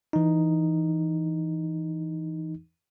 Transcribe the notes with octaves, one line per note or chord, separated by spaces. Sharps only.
E3 D#4